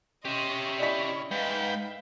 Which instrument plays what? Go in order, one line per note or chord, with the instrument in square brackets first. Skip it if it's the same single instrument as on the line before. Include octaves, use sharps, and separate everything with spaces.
[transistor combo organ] C#4 [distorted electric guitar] G4 E5 [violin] D#5 C6
[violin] E4 [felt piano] D5 D#5 B6
[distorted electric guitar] G#2 [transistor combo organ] B4 G5 [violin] E5 F5